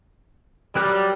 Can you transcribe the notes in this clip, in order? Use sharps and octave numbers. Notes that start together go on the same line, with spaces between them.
F#3 G3 A#4 F#6